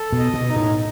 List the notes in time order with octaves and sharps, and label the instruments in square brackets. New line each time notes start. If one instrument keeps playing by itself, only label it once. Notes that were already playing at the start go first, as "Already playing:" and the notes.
Already playing: [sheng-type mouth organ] A4
[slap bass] B2
[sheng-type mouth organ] D#5
[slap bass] B2
[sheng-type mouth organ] D#4
[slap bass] A2